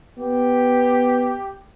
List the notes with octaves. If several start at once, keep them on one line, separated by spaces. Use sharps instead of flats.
B3 G4